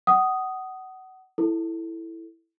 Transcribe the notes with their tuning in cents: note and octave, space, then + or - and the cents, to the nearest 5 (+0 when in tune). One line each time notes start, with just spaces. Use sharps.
F#5 +25 D#6 +0
E4 +0 A4 +0